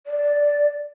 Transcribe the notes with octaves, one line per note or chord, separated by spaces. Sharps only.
D5